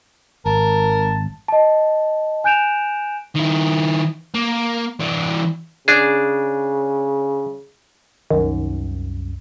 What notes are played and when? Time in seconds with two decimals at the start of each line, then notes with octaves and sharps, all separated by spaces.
0.46 G#1 A#4 A5
1.48 D#5 A5
2.44 G#5 F#6 G6 D7 E7 F7
3.35 D#3 E4
4.34 A#3
5.00 E3 D4
5.88 C#3 D4 G#4
8.31 C2 F#2 D#3